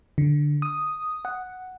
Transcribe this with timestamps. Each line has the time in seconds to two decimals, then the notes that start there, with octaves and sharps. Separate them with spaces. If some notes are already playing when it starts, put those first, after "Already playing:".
0.18 D3
0.62 D#6
1.25 F#5